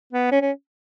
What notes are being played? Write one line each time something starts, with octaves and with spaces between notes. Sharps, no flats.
B3
C#4
C#4